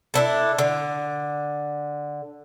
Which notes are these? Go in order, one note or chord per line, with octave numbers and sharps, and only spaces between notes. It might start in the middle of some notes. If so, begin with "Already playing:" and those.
D4 E4 A4
D3